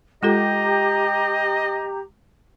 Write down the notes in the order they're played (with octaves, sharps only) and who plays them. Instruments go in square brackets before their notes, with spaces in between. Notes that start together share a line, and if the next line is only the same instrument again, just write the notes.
[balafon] G#3 F4 A4 [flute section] G4 A#5 [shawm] D#5